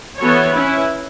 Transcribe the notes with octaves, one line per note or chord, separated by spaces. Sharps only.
E3 B3 F#4 A4 C#5
C#4 E4 B4